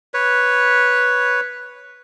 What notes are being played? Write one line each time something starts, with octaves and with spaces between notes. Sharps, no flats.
B4 C#5